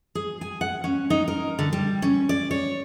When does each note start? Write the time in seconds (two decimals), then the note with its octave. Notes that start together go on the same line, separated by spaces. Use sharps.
0.15 G#4
0.41 G#5
0.61 F#5
0.84 C#4
1.10 D#4
1.28 A#4
1.59 D3
1.73 G3
2.02 C#4
2.29 D5
2.51 C#5